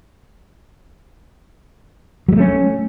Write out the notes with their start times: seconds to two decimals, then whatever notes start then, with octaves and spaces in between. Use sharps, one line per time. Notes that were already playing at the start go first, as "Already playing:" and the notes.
2.28 F#3
2.32 G#3
2.36 A3
2.40 C#4